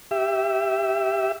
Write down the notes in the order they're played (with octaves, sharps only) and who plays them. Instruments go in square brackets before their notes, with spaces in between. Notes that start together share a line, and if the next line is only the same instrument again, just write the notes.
[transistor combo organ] G4 E5